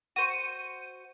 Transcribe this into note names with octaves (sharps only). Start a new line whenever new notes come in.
F#4 C5 C#6 D#7